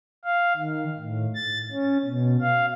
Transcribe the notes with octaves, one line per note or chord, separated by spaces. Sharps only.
F5
D#3
A2
A6
C#4
B2
F5